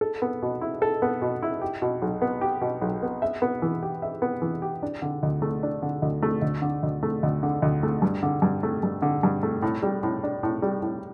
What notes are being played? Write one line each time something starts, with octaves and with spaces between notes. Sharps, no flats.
A4
B3
B2
E4
A4
B3
B2
E4
G4
B2
B1
B3
G4
B2
B1
B3
E5
B3
E3
G4
E5
B3
E3
G4
D4
D3
D2
A3
D4
D3
D2
A3
D2
D3
D2
A3
D2
D3
D2
A3
G2
D3
G2
A3
G2
D3
G2
A3
A2
G3
A2
D4
A2
G3
A2